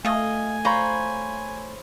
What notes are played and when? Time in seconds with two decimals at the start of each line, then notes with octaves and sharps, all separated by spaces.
0.05 A3 F4 D#5 G#5
0.65 F4 C5 C#5 A#5 B5